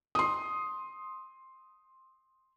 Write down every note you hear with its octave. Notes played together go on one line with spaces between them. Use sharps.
C6 D#6